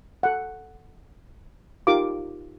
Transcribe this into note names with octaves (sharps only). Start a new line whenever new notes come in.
A4 F#5
D#4 F4 G4 A#4 F5 D6